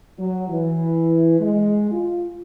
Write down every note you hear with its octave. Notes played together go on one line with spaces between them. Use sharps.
F#3
E3
G#3
F4